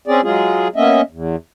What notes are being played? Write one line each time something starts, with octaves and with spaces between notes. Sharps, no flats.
C4 C#4 G#4 D5
F#3 G#3 F4 G#4
A#3 B3 C#4 D#5 E5
E2